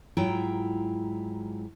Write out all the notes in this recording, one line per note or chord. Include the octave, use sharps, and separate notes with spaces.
G#2 F#3 E4 F4 G5